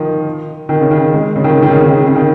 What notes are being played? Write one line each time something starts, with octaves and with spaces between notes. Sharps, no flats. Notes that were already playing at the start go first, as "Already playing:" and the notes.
Already playing: D#3 F3
D#3
C#3
D#3
G#3
C#3
D#3
C#3
D#3
C#3
D#3
C#3
D#3
C#3
D#3